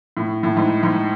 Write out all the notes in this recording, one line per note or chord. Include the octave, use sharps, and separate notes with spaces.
A2
A2
G#2
G#2